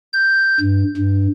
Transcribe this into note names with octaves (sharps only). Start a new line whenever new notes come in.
G6
G2
G2